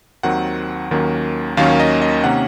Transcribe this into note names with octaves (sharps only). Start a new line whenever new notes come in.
D#2 D#3 F#3 C4 F#5
D#2 D#3 F#3 A#3 C#4
D#2 D#3 F#3 A#3 C#4 F5
D#5
D#5
C3 D#3 A#3 C#4 F#5